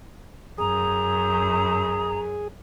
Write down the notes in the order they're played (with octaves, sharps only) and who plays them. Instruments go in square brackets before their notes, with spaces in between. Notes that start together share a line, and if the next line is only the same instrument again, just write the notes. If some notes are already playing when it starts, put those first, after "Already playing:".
[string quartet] F#2 [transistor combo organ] G#4 [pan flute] A#5 [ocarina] D#6